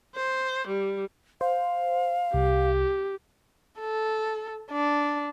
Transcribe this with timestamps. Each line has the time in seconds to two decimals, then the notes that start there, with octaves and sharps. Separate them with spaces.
0.15 C5
0.67 G3
1.41 C5 F5
2.34 C2 G4
3.80 A4
4.71 D4